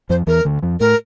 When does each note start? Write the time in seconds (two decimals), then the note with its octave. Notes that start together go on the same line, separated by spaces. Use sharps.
0.10 F2 F3 C5
0.27 E2 E3 A#4
0.45 D2 D3
0.62 F2 F3
0.80 A2 A3 A#4